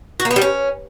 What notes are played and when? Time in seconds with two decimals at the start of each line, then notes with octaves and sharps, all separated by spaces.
0.20 F#4
0.25 A#3
0.31 B3
0.36 G3
0.42 C#4